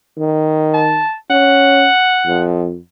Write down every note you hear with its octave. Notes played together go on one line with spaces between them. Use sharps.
D#3
A5
C#4 F#5
F2